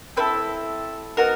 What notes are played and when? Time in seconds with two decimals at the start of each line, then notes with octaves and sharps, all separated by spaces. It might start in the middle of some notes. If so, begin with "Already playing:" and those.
0.17 C4 E4 A4 B4
1.17 B3 D#4 F#4 A#4